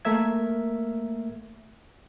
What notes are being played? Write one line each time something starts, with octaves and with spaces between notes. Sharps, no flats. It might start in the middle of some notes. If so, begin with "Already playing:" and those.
A3 A#3 A#4 E5 G#6